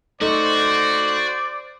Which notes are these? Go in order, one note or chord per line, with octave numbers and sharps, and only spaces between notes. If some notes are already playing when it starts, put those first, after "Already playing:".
A3 D#4 F#4 C5 D5